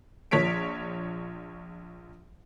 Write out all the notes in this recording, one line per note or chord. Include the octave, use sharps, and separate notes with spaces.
A#1 F3 C#5 B6 D7